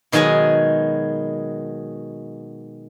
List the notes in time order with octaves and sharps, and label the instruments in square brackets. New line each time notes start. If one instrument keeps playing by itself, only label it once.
[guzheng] B2 D#3 F#3 G#3 G#4 G#5